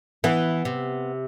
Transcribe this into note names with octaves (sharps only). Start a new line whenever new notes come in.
E3 B3
C3